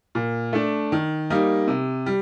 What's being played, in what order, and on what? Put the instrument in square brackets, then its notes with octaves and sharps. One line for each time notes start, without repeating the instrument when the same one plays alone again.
[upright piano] A#2
A3 D4
D#3
G3 A#3 D#4
C3
G3